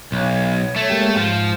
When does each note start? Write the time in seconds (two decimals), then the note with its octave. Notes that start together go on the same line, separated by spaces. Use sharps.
0.12 B1 C#5
0.76 A3
0.90 G#3 A#3 G4
1.16 G#2 F3